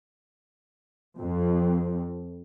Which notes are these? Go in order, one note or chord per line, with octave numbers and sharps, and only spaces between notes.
F2